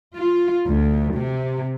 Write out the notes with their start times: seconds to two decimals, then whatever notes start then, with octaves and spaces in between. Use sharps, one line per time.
0.16 F4
0.67 D2
1.17 C3